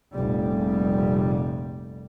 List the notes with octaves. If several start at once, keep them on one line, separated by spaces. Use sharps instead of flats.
F1 A#1 G3